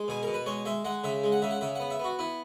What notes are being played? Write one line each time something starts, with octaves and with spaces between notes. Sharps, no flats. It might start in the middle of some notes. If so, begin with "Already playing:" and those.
Already playing: G#3
B2 G#4
B2 A#4
B4
G#3 C#5
G#3 E5
G#3 F#5
C#3 E5
G#3
F#5
C#3 E5
F#5
C#3 E5
B3 F#5
E5
B3 F#4
B3 E4